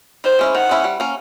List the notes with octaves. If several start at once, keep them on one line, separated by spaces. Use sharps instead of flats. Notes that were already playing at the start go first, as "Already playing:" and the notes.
D#3 C5
G#3 C#4 E4
D#3 F#5
G#3 C#4 E4
G3
A#3 C#4